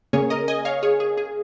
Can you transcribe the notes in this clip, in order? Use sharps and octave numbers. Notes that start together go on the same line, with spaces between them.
C#3 A#3 C#4 G#4 C#5
A#4 D#5
D#5 G#5
C#5 F5
G#4 C#5
G#4
G#4